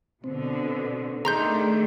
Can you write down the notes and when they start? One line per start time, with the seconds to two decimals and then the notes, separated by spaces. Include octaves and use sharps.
0.24 B2 D3 C4
1.25 D#3 A3 D4 G#4 A#5 C6 G6